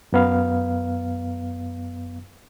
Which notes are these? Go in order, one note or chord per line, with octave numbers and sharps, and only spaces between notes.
F#2 B3 F5